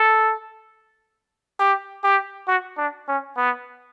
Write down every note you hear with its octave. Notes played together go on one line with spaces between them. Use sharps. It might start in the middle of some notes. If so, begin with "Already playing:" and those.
Already playing: A4
G4
G4
F#4
D4
C#4
B3